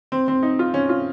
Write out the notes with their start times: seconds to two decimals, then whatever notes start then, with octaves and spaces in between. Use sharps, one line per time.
0.12 C4
0.28 C4
0.43 D#4
0.59 F4
0.74 C#4
0.89 F4